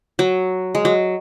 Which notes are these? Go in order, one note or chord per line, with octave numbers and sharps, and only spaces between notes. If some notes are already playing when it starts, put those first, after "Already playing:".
F#3
G#3
F#3